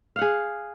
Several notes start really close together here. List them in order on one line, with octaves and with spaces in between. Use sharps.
F5 F#5 G#4